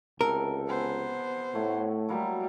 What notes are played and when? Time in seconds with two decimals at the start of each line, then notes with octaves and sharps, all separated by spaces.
0.21 C#2 C3 A4 A#4 G5
0.68 B3 C5 G#5
1.55 A2 A3 C#5 F#5
2.09 F#3 G3 A#3 E4